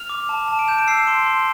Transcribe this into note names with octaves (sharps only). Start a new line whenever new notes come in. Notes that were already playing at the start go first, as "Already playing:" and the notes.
Already playing: F6 F7
D6
A5
A5
D7
G6 E7
D7
E6 C7
E7
C6 D7
C6